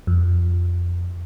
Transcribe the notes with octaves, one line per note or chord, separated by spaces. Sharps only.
F2